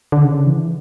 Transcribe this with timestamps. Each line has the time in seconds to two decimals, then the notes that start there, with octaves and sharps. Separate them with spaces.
0.12 D3
0.24 C#3
0.47 E3